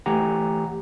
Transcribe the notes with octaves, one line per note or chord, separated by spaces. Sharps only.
E3 A3 G4 F#5 G#5 A#5